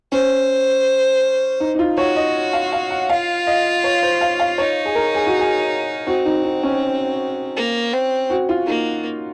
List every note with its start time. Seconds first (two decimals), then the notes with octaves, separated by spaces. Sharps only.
0.12 C#4 C5
1.60 D#4
1.75 D#4
1.79 F4
1.97 F#4 C#5
2.16 D#5
2.53 F5
2.72 F5
2.91 F#5
3.09 F4 F5
3.47 D#5
3.84 C#5
4.03 C5
4.21 F5
4.39 F5
4.58 D#4 C#5
4.85 G#4
4.95 A#4
5.14 G#4
5.27 F#4
5.39 G#4
6.06 C4 F#4
6.26 D#4
6.44 D#4
6.63 C#4
7.56 A#3
7.93 C4
8.30 F#4
8.49 F4
8.67 A#3 D#4